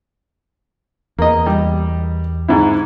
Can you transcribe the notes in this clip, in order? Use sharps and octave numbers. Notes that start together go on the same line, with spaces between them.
E2 A#3 D#5
G3
G#2 D3 E4